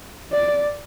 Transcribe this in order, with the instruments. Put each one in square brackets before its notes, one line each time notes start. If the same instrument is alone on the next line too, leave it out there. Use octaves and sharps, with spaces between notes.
[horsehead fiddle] D5